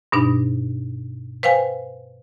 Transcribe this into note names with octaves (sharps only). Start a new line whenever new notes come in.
G2 B2 D4 D#4
B4 C5 F5 G5 G#5